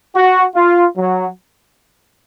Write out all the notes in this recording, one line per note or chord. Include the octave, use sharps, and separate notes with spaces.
F#4
F4
F#3